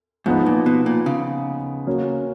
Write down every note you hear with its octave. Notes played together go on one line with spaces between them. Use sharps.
G#2 F3 B3 D#4
A#2
B2
A#2
C#3
F#3 A#3 C#4